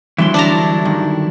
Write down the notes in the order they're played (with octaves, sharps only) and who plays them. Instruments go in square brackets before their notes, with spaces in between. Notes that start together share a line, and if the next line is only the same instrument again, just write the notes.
[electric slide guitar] D3 F#3 E4 [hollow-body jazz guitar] E3 G3 C6
[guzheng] D4 A5 A#5
[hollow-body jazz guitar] G2 D#3